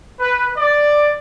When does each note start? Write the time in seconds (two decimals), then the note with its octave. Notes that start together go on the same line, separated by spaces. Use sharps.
0.19 B4
0.57 D5